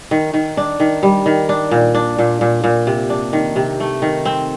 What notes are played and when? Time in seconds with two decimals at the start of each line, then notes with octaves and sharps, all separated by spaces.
0.11 D#3
0.34 D#3
0.57 D4
0.80 D#3
1.03 G3
1.26 D#3
1.49 D4
1.71 A#2
1.95 D4
2.19 A#2
2.41 A#2
2.64 A#2
2.87 C3
3.10 D4
3.33 D#3
3.56 C3
3.80 A3
4.02 D#3
4.25 C4